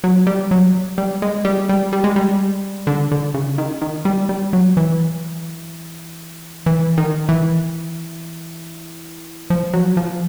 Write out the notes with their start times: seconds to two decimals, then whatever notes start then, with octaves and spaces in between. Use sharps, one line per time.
0.04 F#3
0.27 G3
0.51 F#3
0.98 G3
1.22 G#3
1.45 G3
1.69 G3
1.93 G3
2.04 G#3
2.16 G3
2.87 D3
3.11 D3
3.34 C#3
3.58 D#3
3.82 D#3
4.05 G3
4.29 G3
4.53 F#3
4.77 E3
6.66 E3
6.98 D#3
7.29 E3
9.50 F3
9.74 F#3
9.97 F3